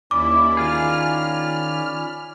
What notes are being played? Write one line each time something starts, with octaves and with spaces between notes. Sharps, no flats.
D#2 C#4 E4 D5 B5 D6
D#3 F4 G#4 F6